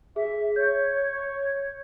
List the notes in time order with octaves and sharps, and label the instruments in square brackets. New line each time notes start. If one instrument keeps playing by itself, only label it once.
[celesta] G#4 [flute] E5
[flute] C#5 [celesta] G6